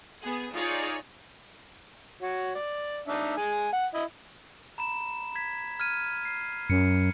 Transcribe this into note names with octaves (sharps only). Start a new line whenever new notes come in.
B3 G#4
D#4 F4 G#4 C#5 D5
F#4 C#5
D5
D4 D#4 E5
G#3 G#5
F#5
E4 D#5
A#5 B5 E7
G#6 B6
F6 G#6 D#7
C7
F#2 C#7